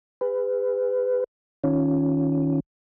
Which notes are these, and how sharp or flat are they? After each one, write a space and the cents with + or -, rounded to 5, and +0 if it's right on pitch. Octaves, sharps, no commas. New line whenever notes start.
G#4 -40 B4 +25
D#3 +0 C#4 +0 F4 +5